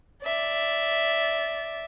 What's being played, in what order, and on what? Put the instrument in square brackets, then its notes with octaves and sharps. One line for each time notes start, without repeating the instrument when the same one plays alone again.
[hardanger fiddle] D5 E5